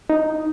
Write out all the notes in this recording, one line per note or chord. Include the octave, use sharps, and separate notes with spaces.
D#4